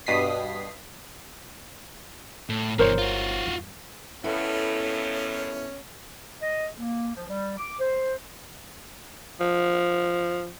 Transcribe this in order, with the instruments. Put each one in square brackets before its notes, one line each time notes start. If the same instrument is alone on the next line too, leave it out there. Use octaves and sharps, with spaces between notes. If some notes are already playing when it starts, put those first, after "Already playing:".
[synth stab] G2 B2 D#6 B6 C7
[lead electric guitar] A2
[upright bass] G1 [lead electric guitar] B2 E3 [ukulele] A#4 C5 C#5
[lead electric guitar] F4 F#4
[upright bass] E2 G2
[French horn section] D#2 A2 [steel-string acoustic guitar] B3 E4 A4 [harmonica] C#4
[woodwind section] D#5
A#3
F3
G3
D6
C5
[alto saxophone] F3